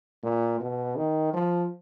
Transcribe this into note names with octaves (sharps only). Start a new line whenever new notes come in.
A#2
B2
D#3
F3